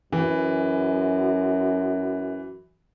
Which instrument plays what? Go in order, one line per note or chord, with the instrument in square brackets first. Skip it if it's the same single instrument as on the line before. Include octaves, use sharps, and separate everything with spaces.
[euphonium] F#2 [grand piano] E3